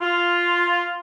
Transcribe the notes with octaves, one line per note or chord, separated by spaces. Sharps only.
F4